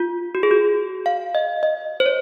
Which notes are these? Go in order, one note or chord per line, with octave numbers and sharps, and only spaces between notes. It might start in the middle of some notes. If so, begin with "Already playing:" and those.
Already playing: F4
F#4
G#4
F#4
F5
D#5
D#5
C5
C#5